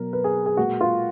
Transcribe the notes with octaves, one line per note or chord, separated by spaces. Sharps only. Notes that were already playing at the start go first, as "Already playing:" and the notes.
Already playing: B2 F#3 A#4
B4
G#4
G#4
A#2 G#3 F#4
F4